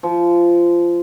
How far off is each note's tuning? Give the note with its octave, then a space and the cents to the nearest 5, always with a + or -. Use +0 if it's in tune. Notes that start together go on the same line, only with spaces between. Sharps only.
F3 -15